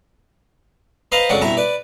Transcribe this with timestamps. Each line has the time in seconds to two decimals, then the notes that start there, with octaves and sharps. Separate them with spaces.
1.12 B4 C5 D#5 F5 A#5 B5
1.29 F2 C#3 F#3 G#3 D5 F#5
1.41 G2 B2 E4 E5 A#5
1.57 B4 D5